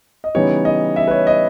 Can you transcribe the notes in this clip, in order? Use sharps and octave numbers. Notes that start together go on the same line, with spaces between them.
D#5
C#3 E3 G3 B3 D#4 C#5
D#5
E5
B4
C#5
D#5